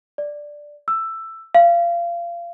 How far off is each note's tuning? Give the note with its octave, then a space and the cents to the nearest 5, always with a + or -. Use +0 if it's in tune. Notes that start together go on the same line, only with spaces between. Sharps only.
D5 +0
E6 +10
F5 -25